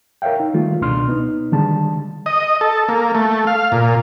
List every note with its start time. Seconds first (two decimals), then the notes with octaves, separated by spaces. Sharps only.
0.22 A#4 C#5 E5 F5 G5
0.40 D#4
0.54 D#3 G3 A3 F4
0.81 C#2 B2 D4 C6 F6
1.09 B3 D#4
1.52 D3 D#3 G3 G#3 A5
2.26 D#5
2.61 A4
2.89 A#3
3.15 A3
3.47 F5
3.72 A#2